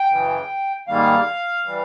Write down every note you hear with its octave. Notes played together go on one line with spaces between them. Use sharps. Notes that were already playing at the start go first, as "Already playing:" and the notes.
Already playing: G5
F#2 C#3 E3
G#2 D#3 G3 A#3 F5
E3 G3